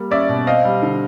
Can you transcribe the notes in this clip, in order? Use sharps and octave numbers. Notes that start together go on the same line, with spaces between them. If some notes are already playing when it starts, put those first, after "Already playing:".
Already playing: G3 A#3
C#4 D5 E5
B2
C4 D#5 F5
G3
D3